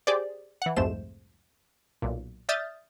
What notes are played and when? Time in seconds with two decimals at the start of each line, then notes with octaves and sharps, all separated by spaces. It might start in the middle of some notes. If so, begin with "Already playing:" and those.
0.07 G4 G#4 C5 D5
0.62 E3 F#5
0.76 C2 F2 G#2 A3 C5 E7
2.02 B1 A#2
2.49 D5 E5 D#6 F6 G6 A6